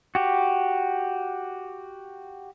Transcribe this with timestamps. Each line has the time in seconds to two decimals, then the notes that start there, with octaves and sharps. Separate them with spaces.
0.15 F#4 G4